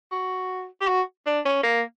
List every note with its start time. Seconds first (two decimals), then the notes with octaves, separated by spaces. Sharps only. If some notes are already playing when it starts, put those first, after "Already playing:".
0.12 F#4
0.81 G4
0.88 F#4
1.26 D4
1.45 C#4
1.63 A#3